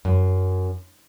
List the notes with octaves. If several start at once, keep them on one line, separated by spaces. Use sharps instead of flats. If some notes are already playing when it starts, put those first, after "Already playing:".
F#2